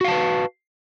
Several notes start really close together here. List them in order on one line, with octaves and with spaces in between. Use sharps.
F#4 F5 A5 B4